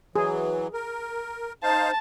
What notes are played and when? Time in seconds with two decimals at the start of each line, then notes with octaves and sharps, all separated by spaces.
0.16 E3 F#3 G#4
0.74 A#4
1.63 D#4 C5 F5 A5